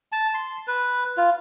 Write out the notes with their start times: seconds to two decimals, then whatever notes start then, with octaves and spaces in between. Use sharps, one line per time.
0.12 A5
0.34 C6
0.67 B4
1.17 F4